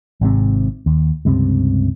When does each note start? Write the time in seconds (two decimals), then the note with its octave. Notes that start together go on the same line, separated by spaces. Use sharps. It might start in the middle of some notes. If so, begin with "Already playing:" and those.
0.21 G#1 G#2 C3
0.86 D#2
1.25 C#2 G2 C3